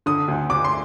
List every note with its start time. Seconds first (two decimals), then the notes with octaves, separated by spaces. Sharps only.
0.06 D3 D#6
0.28 D2
0.50 D2 D6
0.64 C6